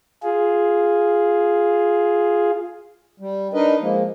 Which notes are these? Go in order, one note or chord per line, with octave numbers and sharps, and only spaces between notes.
F4 G#4
G3
D4 D#4 A#4 B4 D#5
F3 G#3 A#3